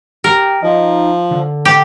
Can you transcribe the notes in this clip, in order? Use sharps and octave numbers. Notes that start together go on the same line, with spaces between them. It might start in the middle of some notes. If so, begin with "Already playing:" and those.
G4 A#4
F3 D#4
D3
G4